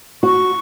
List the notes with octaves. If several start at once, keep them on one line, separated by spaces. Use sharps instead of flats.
F#4 C#6